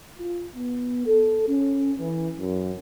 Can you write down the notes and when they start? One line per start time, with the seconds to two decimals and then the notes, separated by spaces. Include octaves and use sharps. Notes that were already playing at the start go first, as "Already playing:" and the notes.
0.18 F4
0.56 B3
1.07 A4
1.49 C#4
2.00 E3
2.40 F#2